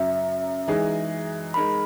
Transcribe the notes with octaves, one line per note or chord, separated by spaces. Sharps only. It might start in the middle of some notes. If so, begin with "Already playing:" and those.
Already playing: F#2 C#3 F#3 E5
E3 G#3 D#4 G#4
G#3 D#4 A#4 B5